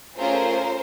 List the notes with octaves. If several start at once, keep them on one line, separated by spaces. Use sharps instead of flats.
A3 C#4 F4 G#4 A#4 C5